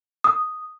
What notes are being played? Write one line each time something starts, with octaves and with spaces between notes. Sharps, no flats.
D#6